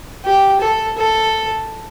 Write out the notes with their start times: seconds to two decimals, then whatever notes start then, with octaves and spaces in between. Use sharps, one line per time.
0.25 G4
0.61 A4
0.98 A4